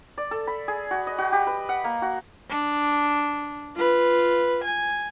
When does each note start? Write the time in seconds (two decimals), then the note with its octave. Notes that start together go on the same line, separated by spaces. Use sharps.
0.18 D5
0.31 A4
0.47 B5
0.68 G#4
0.91 F#4
1.07 D#5
1.18 F#4
1.32 G4
1.47 B4
1.69 F#5
1.84 A#3
2.02 F#4
2.50 D4
3.76 F4 B4
4.64 G#5